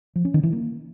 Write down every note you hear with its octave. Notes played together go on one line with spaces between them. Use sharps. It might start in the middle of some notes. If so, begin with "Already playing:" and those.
F3
C#4
D#3
E3
A#3